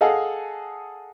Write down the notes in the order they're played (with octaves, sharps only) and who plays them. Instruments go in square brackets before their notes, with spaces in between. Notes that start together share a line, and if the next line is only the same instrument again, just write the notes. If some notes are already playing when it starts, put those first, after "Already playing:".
[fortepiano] G#4 A4 D#5 F5 F#5 G#5